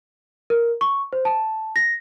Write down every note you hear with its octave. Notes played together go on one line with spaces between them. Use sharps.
A#4
C#6
C5
A5
A#6